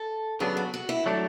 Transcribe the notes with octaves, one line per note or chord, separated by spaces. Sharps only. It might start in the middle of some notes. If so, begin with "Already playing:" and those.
Already playing: A4
C#3 F#3 B3 D4 G#4
F#4
F#4
E4
F#3 A3 D4